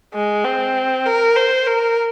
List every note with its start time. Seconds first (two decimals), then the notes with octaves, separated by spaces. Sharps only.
0.14 G#3
0.45 C4
1.06 A#4
1.36 C5
1.67 A#4